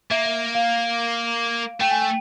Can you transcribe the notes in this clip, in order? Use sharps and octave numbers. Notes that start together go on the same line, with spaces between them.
A#3 E5
E5
F5
A3 G5
G#5
G5